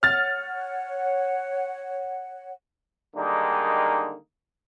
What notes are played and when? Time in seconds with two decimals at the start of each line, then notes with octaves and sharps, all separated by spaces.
0.03 C#5 F#5 F6 A6
3.15 D3 D#3 G3 G#3 A#3 D#4